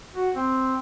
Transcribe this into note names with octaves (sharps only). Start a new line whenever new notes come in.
F#4
C4